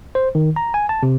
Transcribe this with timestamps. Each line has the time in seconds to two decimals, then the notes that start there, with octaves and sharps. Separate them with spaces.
0.15 C5
0.35 D#3
0.56 A#5
0.74 G#5
0.89 A5
1.03 C3